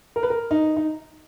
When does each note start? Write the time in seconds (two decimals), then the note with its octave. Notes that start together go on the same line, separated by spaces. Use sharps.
0.16 A#4
0.23 B4
0.30 A#4
0.51 D#4
0.77 D#4